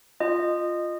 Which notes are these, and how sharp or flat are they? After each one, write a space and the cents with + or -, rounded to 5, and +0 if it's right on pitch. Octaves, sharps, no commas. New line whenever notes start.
F4 +0 D#5 -20